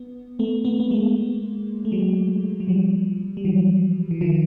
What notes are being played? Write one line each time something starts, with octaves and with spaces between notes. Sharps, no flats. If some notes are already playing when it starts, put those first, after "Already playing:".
Already playing: B3
A3 B3
A3 B3
B3
G#3 A#3
A3
F#3 G#3
F#3
F3 G3
G3
E3 F#3
E3
D#3 F3